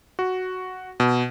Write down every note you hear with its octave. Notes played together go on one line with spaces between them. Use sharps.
F#4
B2